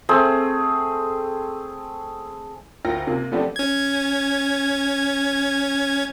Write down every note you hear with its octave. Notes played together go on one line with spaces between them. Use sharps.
A3 C4 G#4
D2 F4 A#4 G5 A#6
C3 A#3 F4
F3 A3 B3 C4 D4 G4
C#4 G#6